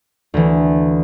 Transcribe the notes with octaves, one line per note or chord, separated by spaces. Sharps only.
D2 E3